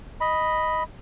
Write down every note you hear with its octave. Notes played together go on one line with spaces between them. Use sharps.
D#5 B5